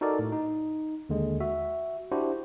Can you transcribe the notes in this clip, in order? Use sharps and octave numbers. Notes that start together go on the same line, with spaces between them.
D#4 F#4 A4 A#4 D5
A2
D#4
D#2 D3 G#3
F#4 E5
D4 E4 F#4 G4 C5